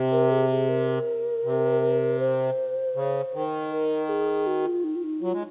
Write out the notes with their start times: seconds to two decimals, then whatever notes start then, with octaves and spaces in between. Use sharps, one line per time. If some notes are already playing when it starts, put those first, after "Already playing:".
Already playing: C3
0.11 A#4
0.31 G#4
0.50 G#4
0.69 A#4
1.45 C3
2.20 C5
2.95 C#3
3.34 D#3
3.71 A#4
4.09 G#4
4.47 F#4
4.66 F4
4.84 D#4
4.96 F4
5.04 D#4
5.22 F#3 F4
5.33 G#3